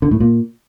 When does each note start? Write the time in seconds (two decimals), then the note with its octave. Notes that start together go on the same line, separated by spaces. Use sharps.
0.02 D3
0.11 A2
0.20 A#2